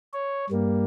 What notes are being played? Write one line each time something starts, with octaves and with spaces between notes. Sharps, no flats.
C#5
G2 G3 A#3